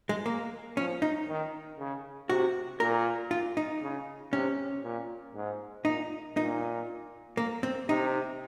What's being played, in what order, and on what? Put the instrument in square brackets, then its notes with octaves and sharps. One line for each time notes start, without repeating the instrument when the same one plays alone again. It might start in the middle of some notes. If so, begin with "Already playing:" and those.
[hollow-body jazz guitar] G#3
A#3
[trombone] F3 [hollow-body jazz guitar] C#4
[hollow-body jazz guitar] D#4
[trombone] D#3
C#3
[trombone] C3 [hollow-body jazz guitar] F#4
[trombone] A#2 [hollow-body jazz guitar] A#4
[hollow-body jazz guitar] F4
D#4
[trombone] C#3
[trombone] C3 [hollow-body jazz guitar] C#4
[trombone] A#2
G#2
[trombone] A#2 [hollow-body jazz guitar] D#4
[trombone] A#2 [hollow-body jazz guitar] D#4
[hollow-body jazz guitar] A#3
C4
[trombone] C3 [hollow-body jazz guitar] D#4